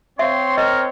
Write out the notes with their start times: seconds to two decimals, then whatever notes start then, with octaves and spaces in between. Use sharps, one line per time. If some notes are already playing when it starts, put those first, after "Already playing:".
0.19 C4 C#5 E5 F5 C6
0.57 A#4 D#5